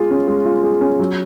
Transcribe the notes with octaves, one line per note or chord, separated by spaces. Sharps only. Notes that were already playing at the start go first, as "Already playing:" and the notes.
Already playing: G#3 F4 G#4
C#4
G#3
F4
G#4
C#4
F#3